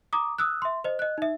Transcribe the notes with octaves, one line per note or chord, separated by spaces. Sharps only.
A#5 D6 D#6
D#6 E6 F#6
E5 C6
C5 D#5
D#5 F#6
D#4 E5